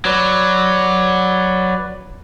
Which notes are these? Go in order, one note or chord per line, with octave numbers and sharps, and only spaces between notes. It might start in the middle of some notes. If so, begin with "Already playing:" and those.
F#3 B4 D5